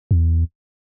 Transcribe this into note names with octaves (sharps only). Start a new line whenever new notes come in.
E2